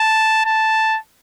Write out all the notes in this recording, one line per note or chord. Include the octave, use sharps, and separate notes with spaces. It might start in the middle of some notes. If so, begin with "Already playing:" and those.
Already playing: A5
A5